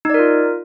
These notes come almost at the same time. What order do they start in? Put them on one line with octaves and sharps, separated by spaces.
D#4 D5 A#4 F4